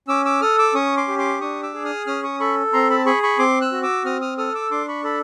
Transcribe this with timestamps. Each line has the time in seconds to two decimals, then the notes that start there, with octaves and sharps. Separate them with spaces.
0.08 C#4 D6 E6
0.25 D6 E6
0.41 A4 D#6 F6
0.58 D6 E6
0.74 C#4 C#6 D#6
0.97 C6 D6
1.08 G4
1.18 C6 D6
1.41 D4 C#6 D#6
1.63 D6 E6
1.74 G#4
1.85 D#6 F6
2.06 C#4 D#6 F6
2.23 C#6 D#6
2.40 A4 B5 C#6
2.73 C4 A#5 C6
2.90 A5 B5
3.06 G#4 B5 C#6
3.23 B5 C#6
3.38 C4 C6 D6
3.61 E6 F#6
3.72 F#4
3.83 D6 E6
4.05 C4 D#6 F6
4.21 D#6 F6
4.38 A4 D#6 F6
4.55 D6 E6
4.71 D4 C6 D6
4.88 B5 C#6
5.04 A4 A5 B5